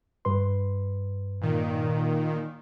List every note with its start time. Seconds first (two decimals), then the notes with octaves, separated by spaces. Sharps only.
0.25 G2 B4 C6
1.41 A#2 D#3